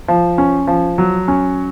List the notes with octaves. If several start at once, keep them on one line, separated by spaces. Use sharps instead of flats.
F3
C#4
F3
F#3
C#4